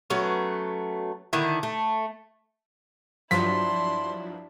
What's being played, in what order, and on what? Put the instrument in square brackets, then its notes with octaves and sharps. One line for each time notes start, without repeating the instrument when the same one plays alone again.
[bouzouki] F#3 A3 B3 C#4
D3 D#3 E4
A3
[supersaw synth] G2 F3 F#3 [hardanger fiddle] D4 E4 [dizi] C6 [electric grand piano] B6